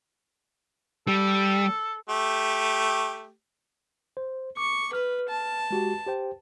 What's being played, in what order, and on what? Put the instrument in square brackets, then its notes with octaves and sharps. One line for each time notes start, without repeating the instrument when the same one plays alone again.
[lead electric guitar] G3 [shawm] A4
[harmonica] A3 G4
[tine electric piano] C5
[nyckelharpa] C#6 [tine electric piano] D6
[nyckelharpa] B4 [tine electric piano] F6
[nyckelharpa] A5
[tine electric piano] G#3 F#4 G4
G4 C5 G5